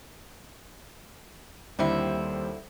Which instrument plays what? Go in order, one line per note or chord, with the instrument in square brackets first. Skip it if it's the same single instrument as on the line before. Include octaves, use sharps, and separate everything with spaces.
[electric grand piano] D#2 G3 C5 [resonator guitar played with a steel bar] D3 C4 E4